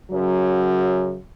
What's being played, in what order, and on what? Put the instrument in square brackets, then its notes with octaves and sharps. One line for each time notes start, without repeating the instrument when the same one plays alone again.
[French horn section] F#2 C#3 F#3